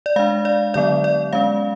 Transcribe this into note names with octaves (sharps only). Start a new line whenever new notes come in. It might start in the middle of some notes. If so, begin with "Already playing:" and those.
D5
G#3 D4 F5
D5
D3 F#3 B3 D5
D5
G#3 C#4 F5